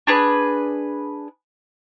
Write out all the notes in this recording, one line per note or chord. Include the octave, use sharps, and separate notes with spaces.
D4 G#4 B4